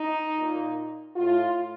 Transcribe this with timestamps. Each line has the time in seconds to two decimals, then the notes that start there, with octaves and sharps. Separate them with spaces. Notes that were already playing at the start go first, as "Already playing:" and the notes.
Already playing: D#4
0.38 A#2
1.16 A2 F4